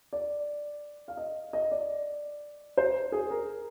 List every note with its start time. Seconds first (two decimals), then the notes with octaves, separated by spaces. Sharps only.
0.13 D5
1.08 F5
1.17 D#5
1.53 D#5
1.72 D5
2.77 C5
3.12 G#4
3.30 A#4